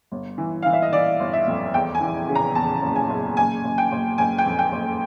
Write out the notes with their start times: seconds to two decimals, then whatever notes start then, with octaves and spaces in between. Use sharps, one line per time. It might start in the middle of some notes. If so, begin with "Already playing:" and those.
0.12 G1
0.38 E3
0.62 E3 F5
0.73 E5
0.82 D#5
0.92 E3 D5
1.20 G1
1.33 E5
1.48 F2
1.74 E2 G5
1.95 G#5
2.01 E3
2.28 C#3
2.35 A#5
2.55 E2 A5
2.82 F#1
2.96 G#5
3.09 F#1
3.37 F#1 G#5
3.64 F#1
3.78 G5
3.92 F#1
4.18 F#1 G#5
4.38 G5
4.46 F2
4.59 G5
4.72 F#1